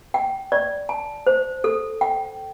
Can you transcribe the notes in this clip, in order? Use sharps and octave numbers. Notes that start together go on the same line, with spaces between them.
G5
D5
A5
C5
A4
G5